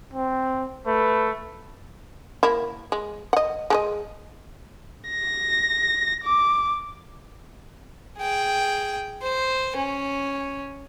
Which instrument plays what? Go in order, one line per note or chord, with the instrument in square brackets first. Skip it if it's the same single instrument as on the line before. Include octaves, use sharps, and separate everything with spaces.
[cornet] C4
[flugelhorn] A3 [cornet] B4
[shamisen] A#3 E4
G#3
D#5 F#5
G#3 A4 D#5
[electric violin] A#6
D6
[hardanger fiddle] G#4 G5
C5
C#4